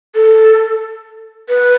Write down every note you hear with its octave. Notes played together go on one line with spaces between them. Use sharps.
A4
B4